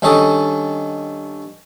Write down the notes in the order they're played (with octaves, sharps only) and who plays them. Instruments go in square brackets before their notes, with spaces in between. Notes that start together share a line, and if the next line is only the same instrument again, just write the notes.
[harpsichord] G2 D#3 C#4 A4 A5 D#6